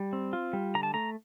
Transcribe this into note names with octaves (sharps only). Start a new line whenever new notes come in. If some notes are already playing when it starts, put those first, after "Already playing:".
Already playing: G3
C4
F4
G3
D3 A#5
A5
A3 A#5